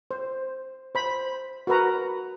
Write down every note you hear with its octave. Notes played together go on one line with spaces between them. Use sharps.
C5
C5 B5
F#4 A#4 B4 A#5